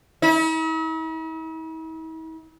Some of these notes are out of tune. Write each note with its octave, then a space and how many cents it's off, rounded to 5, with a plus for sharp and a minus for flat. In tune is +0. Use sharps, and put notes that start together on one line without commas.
E4 -45